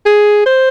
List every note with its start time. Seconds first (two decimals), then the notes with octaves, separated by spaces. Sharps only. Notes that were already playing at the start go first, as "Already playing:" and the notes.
0.06 G#4
0.46 C5